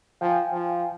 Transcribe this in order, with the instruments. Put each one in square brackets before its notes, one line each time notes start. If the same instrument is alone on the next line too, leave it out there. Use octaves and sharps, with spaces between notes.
[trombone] F3 [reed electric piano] F5 G5 G#5
[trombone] F3